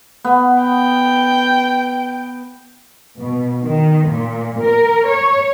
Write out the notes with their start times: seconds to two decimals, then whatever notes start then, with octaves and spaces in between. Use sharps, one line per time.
0.24 B3
0.63 G5
3.18 B2
3.63 D#3
4.09 A#2
4.61 A#4
5.07 C#5